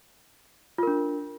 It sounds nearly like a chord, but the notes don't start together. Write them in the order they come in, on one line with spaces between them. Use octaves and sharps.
F4 A#4 D4